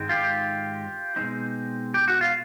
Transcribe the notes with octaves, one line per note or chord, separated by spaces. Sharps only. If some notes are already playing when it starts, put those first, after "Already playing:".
Already playing: G#2 D#3 G#3 C4
F4 G4
B2 G#3 C4 D#4
G4
F#4
F4